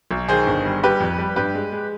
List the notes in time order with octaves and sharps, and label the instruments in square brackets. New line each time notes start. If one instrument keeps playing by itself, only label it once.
[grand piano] B1
D#3 G#4 C5
G1
G3
G3 G4 B4
F2
G3
G2 G4 B4
G#3
G#3